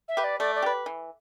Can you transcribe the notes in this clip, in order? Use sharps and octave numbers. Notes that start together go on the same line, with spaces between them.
E5
G4 B4
D5
A3 D5
D5
G4 B4
E3